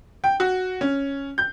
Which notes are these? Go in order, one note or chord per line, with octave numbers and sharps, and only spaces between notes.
G5
F#4
C#4
G6